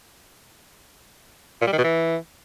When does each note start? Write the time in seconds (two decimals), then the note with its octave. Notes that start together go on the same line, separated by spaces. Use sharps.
1.62 A#2
1.67 G3
1.73 D#3
1.78 B2
1.84 E3